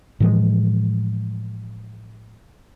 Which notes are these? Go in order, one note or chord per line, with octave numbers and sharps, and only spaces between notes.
A2 E3 F3 G#3